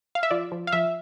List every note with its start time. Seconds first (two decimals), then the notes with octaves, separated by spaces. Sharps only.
0.15 F5
0.23 E5
0.31 F3 D5
0.52 F3
0.67 F5
0.72 F3 E5